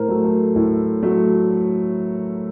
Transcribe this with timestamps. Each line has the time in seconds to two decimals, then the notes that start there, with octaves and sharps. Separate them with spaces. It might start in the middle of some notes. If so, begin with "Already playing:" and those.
Already playing: A2 A#4 C5
0.08 F#3 A3
0.24 A4
0.56 A2
1.03 F#3 A3